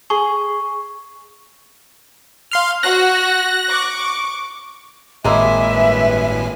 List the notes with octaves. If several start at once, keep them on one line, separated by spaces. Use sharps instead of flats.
G#4 C#6
F5 C6 F6
F#4 F#6 A#6
C#6 D6
G#1 A2 G#3 A#3 E4 E5 G#5
G2 B4